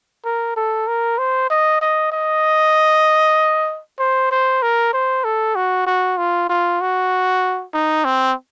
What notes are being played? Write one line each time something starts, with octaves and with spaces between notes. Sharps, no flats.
A#4
A4
A#4
C5
D#5
D#5
D#5
C5
C5
A#4
C5
A4
F#4
F#4
F4
F4
F#4
D#4
C4